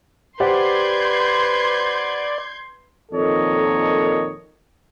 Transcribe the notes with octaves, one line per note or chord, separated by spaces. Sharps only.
G4 B4 C5 D5 F#5 C6 G6 G#6
F2 A#2 D#3 A4 C#5 D#5